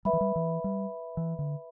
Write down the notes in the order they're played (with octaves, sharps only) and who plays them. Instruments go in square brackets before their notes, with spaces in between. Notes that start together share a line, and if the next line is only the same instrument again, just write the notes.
[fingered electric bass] G3 [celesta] B4 E5 B5
[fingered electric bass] E3
G3
E3
G3
E3
D3